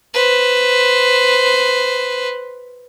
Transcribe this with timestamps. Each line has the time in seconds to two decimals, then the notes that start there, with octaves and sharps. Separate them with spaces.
0.14 B4 C5